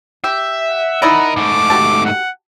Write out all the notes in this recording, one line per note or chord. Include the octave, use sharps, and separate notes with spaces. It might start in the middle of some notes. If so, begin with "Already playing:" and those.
G4 E5
F#5
D#4 E4 A#4 D5 D#5
G#2 A3 D6
F#4 G4 A5
F#5